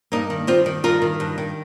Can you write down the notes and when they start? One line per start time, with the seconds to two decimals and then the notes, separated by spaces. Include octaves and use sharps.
0.12 G2 A#3 D#4
0.30 D#3
0.47 G2 C4 F4
0.66 D#3
0.84 G2 F4 A#4
1.02 D#3
1.20 G2
1.38 D#3